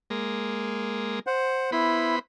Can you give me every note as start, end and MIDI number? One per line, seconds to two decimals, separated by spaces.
0.10 1.19 56
0.10 1.19 58
1.27 1.70 72
1.27 1.70 78
1.72 2.19 59
1.72 2.15 64
1.72 2.19 72
1.72 2.19 83